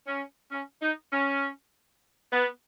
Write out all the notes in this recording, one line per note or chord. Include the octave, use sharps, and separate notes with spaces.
C#4
C#4
D#4
C#4
B3